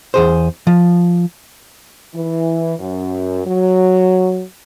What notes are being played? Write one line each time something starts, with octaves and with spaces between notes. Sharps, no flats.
E2 G#4 C5
F3
E3
F#2
F#3